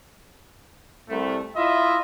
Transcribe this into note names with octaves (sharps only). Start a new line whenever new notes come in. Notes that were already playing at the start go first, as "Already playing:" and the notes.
C2 A3
E4 F4 D#5 E5